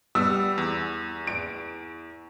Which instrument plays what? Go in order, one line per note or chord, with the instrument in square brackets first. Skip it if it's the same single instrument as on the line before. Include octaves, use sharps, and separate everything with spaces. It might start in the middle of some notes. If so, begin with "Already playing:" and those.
[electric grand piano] G3 B3 [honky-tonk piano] E6
[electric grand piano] E2
[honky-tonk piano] D7